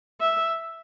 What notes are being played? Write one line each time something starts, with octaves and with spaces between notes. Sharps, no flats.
E5